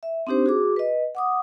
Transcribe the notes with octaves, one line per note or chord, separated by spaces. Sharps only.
E5
C4 D4 D#4 G4 C5
F#4 G#4 D6
B4 D#5
F#5 D6 D#6